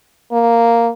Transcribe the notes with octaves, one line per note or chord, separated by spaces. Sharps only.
A#3